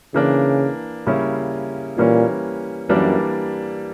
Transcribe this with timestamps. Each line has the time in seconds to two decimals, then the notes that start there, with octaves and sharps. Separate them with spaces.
0.14 C#3 E3 A#3 D4
1.06 C#3 G3 A#3 C#4 E4
1.98 A#2 E3 G3 A#3 C#4
2.89 F#2 E3 G3 A#3 D4